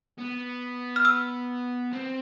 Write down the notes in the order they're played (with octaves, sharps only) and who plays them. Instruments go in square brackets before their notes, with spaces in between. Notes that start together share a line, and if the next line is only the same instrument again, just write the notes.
[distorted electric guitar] B3
[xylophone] F6
E6
[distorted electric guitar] C4